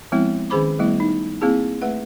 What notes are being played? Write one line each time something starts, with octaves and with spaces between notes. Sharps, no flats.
F3 G#3 B3 C4 E4
D#3 C#4 G#4 C5 B5 D6
G3 A3 B3 E4
D#4
A#3 C4 E4 G#4 A5
A3 B4 F#5